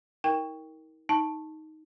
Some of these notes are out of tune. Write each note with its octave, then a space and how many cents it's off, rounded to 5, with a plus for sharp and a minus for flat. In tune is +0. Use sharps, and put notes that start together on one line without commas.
D#4 +45 A#4 +0 G5 +15
D#4 +10 A5 +0